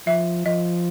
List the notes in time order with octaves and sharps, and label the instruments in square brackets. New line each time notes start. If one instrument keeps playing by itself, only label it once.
[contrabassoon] F3 [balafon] E5
[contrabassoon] F3 [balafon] D#5